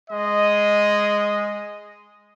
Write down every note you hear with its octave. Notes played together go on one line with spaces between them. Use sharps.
G#3 D#5